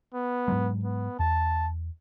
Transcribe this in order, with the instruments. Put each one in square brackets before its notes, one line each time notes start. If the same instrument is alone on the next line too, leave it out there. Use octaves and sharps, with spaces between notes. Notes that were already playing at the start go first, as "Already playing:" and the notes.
[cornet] B3
[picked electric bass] G#2 F#3 G#3
[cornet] B3
[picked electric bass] E2 [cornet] A5